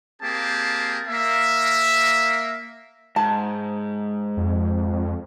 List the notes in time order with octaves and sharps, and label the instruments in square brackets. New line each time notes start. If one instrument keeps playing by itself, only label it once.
[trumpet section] A#3 C4 G4 G#4 A5
A#3 E5
[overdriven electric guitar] G#2 [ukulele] A5
[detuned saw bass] F2